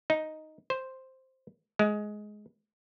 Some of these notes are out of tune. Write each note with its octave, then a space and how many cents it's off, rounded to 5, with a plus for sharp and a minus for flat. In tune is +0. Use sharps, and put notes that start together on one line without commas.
D#4 +0
C5 +0
G#3 +15